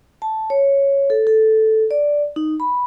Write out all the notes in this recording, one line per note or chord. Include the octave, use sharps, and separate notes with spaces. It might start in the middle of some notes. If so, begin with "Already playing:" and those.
A5
C#5
A4
A4
D5
D#4
B5